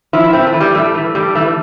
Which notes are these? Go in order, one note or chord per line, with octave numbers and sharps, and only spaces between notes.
F3 E4
A2 C4
A3
E3
G3
A2 A3
E3
A2 G3
E3 A3